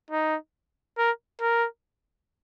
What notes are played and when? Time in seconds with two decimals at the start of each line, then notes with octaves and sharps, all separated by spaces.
0.10 D#4
0.98 A#4
1.41 A#4